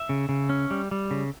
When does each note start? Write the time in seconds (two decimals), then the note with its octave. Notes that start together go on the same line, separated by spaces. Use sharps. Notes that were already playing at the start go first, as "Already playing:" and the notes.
Already playing: E5
0.09 C#3
0.29 C#3
0.49 C#4
0.71 G3
0.91 G3
1.11 C#3